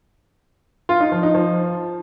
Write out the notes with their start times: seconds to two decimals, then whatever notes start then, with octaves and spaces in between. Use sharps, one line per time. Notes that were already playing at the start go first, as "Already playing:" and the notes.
0.89 F4
1.00 D#4
1.12 F3
1.23 D#4
1.34 F3